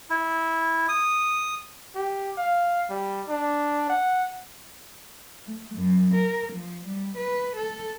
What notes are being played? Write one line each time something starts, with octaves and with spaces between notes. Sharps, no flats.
E4
D#6
G4
F5
G3
D4
F#5
A3
F#2
A#4
F3
G3
B4
A4